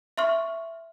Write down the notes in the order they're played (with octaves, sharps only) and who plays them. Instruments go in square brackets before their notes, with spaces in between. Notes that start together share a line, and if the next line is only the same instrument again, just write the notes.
[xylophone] E5 C6 C#6 F6